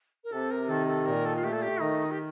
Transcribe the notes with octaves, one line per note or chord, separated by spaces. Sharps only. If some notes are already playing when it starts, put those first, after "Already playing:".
A#4
C3 A4
A#4
D#3 A4
A4
A#2 A#4
A4
F4
A3 G4
A4
G4
D#3 D#4
G4